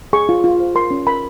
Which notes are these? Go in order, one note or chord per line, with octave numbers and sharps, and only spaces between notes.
G#4 C#6
F4
F4
C5
A#4 C6
C#4
A#4 B5